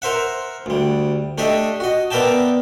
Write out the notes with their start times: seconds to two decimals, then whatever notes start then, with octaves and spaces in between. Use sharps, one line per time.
0.02 A#4 C5 E5 F#5
0.66 D2 G3
1.38 A3 D4 G4 A4 D#5 E5
1.80 F#4 D#5
2.11 B3 A#4 D5 E5 G5 A5